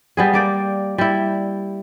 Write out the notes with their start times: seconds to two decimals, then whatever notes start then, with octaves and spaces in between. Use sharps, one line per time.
0.17 G3 B3 G#4
0.33 A#3 D5 G5
0.98 G3 E4